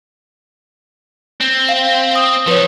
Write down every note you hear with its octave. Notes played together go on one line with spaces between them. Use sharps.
C4
F5
D#6
F3 F#3 B4 C#5